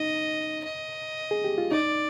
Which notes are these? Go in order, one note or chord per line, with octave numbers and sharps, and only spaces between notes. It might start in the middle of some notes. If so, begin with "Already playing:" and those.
Already playing: D#4 D#5
D#5
G#4
G4
F4
D#4 D5